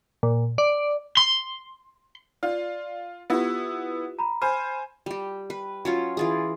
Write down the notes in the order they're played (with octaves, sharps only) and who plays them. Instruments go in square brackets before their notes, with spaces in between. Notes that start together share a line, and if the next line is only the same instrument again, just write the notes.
[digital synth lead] A#2
D5
[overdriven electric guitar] C6
[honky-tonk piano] F4 [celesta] D5
[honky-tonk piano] B3 E4 [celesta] F4 G4
[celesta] A#5 B5
[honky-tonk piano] C5 G#5 [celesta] B5 F6
[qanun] G3 G4
B4
F#3 C#4 F4
E3 F4 G#4